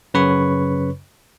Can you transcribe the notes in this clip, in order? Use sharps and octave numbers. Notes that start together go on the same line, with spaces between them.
F#2 C#3 B4 C#5 B5 C#6